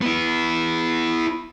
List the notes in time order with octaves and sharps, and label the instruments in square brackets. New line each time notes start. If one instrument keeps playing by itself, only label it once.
[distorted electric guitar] B3 E4